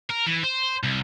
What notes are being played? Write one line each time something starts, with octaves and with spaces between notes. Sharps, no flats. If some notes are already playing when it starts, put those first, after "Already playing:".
A#4
E3
C5
C2